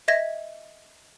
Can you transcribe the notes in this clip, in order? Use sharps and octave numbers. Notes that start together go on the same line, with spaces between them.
D#5 E5 G#6 A#6